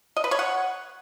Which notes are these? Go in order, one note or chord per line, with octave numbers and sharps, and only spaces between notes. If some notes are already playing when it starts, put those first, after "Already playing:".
D#5
B4
C#5
F#5